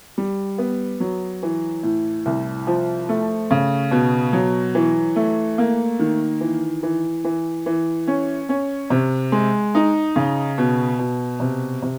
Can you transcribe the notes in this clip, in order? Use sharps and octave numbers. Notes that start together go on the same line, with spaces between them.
G3
B3
F#3
E3
A2
C2
F3
A3
C#3
B2
F#3
E3
A3
A#3
D#3
E3
E3
E3
E3
C#4
C#4
C3
G#3
D#4
C#3
B2
B2
C3
C3